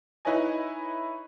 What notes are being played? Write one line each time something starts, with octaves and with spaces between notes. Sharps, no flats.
D#4 E4 B4 C#5 D#5 G#5